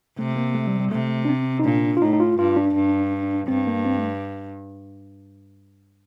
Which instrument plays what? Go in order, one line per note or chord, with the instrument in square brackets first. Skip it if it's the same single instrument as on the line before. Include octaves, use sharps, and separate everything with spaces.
[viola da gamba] C3 [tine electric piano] A3
[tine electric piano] A#3
A3
G3
G3
[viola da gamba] C3 [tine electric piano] A3
[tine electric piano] D4
C4
D#4
[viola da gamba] A#2 [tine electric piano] D4
[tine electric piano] F4
[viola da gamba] A2 [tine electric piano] D#4
[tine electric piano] D#4
F4
[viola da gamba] G2 [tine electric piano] F4
[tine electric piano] D4
[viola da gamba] G2
[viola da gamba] G2 [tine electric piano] C4
[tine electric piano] A#3
C4
A3